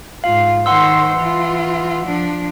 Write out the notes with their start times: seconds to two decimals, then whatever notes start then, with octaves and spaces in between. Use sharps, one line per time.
0.24 G#2 F4 F5
0.66 D#3 C5 F#5 C6 E6
1.16 E3 F4
2.05 F3 D4